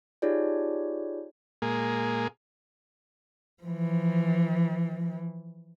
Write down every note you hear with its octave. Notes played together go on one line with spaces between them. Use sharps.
D#4 F4 G4 G#4 C#5 D5
A#2 G#3 A#3 G#4
E3 F3